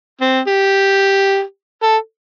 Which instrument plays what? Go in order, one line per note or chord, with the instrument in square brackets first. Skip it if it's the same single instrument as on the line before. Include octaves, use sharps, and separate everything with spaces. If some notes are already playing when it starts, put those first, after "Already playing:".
[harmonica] C4
G4
A4